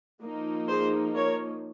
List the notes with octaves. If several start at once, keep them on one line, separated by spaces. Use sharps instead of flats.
F3 A#3 D#4
G#4 C5
A#4 C#5